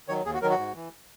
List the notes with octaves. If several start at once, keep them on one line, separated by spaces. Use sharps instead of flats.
D#3 F#3 C#5
D#2 G#4
F#4
D#3 F#3 A#4
F#4
G#2
E3